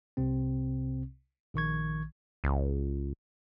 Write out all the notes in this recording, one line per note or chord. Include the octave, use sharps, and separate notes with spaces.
C2 C3 C4
A#1 D#3 C#6 G#6
C#2